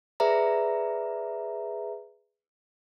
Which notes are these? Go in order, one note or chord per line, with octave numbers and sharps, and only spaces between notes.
G#4 B4 D5 E5 A#5